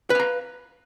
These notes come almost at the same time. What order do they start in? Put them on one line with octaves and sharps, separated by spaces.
B4 F5 A#5